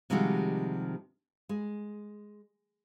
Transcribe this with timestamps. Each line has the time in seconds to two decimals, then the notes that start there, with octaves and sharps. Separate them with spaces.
0.10 C3 D#3 F3 G3 G#3 F#4
1.49 G#3